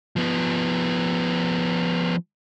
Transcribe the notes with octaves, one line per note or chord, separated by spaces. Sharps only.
F3 B3